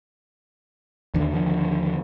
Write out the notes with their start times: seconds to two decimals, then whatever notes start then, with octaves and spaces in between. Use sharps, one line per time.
1.14 D#2 D3
1.33 D#2 D3 F3